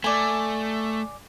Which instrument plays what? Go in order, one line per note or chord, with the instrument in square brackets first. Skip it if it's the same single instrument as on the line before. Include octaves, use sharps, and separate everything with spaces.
[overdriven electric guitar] A3 [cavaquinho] D5 G#5